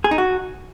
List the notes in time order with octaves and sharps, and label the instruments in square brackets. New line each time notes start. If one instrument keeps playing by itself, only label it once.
[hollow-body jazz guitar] G#4
D#4
F#4